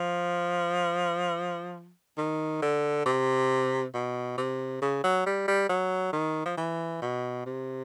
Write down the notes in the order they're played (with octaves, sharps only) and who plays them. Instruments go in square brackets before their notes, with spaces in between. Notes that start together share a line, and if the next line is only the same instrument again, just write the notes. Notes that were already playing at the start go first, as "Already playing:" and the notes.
Already playing: [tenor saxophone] F3
D#3
D3
C3
B2
C3
C#3
F#3
G3
G3
F#3
D#3
F3
E3
B2
C3